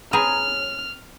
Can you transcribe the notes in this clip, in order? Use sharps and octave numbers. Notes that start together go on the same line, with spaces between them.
C4 G#4 B4 C#5 A#5 F6